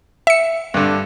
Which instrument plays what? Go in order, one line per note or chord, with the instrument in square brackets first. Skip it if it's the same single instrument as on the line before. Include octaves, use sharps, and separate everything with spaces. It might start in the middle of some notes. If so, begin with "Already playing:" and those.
[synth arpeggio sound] E5 C#7
[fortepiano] G2 D3